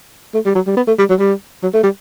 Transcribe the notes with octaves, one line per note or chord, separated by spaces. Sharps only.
A3
G3
F#3
G3
B3
A3
G3
F#3
G3
F#3
A3
G3